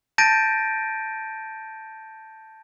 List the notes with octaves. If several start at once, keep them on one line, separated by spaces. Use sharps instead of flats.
A5 G6 A6 A#6 D7 D#7